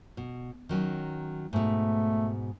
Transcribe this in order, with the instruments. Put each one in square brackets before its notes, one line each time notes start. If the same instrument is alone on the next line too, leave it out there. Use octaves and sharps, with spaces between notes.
[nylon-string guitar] B2
D#3 F#3 C#4
[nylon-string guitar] G#2 B2 [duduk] A3